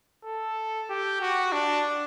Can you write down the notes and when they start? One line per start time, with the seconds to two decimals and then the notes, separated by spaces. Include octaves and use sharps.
0.25 A4
0.90 G4
1.21 F#4
1.52 D4